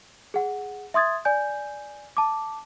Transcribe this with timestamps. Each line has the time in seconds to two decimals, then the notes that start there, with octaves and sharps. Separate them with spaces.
0.34 G#4 F#5
0.94 E5 C6 D#6 G#6 A6
1.25 D5 G#5 G6
2.17 A5 D6